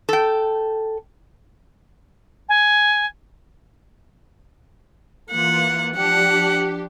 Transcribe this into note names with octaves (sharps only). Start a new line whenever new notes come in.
A4 G5
G#5
E3 A#3 F4 F#5
F3 D4 G4 F#5